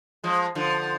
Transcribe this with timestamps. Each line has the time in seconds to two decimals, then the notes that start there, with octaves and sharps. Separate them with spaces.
0.24 F3 G#3
0.55 D3 F3